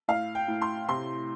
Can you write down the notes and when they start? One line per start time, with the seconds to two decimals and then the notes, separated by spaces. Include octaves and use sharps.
0.08 A2 F5
0.35 G5
0.48 A2
0.62 C6
0.89 C3 C6